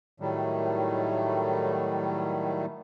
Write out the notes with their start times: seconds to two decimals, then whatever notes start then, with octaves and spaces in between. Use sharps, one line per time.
0.20 A2 D#3 F#3 G3 A3